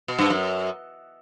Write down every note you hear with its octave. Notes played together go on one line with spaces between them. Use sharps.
B2
G2
F#2